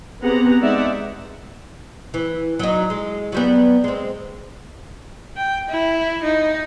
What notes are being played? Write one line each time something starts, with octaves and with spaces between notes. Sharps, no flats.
B3 C4 G4 G#4 F#5 A#5
G#3 D#4 D5 E5 F#5
E3
F#3 D#4
G#3
F#3 G3 B3
G#3 C4
G5
E4
D#4